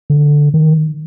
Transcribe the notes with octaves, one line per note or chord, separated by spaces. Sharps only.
D3
D#3